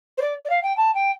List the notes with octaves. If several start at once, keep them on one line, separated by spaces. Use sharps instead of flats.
C5
D5
D5
F5
G5
A5
G5